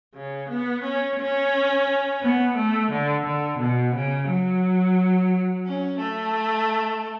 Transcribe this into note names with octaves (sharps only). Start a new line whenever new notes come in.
C#3
B3
C#4
C#4
B3
A3
D3
D3
B2
C#3
F#3
C#4
A3